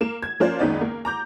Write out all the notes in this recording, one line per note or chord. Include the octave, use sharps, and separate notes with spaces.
A#3 E7
G#6
F3 A#3 C#4 F4 C5 D5
F#1 C#2 D#3 B3 D#4 D5
A#3
A#5 D6 G6